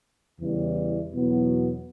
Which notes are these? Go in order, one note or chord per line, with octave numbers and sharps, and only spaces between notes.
E2 C#3 E3 G3
E2 B2 F#3 B3